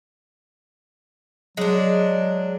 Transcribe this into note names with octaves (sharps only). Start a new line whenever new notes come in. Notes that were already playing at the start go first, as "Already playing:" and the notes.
F#3 G#3 D4